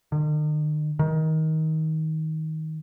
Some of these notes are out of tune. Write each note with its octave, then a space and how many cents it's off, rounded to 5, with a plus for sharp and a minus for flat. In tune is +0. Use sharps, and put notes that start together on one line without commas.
D#3 -45
D#3 +20